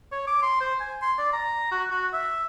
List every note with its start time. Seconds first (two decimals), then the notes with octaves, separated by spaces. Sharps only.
0.12 C#5
0.27 D6
0.42 C6
0.61 C5
0.80 G#5
1.02 C6
1.18 D5
1.33 A#5
1.72 F#4
1.91 F#4
2.13 E5